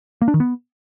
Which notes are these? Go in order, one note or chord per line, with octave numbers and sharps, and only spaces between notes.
A#3
D4
D#3
B3